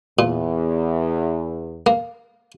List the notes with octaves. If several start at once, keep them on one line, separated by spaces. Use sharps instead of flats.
E2 A#2
A#3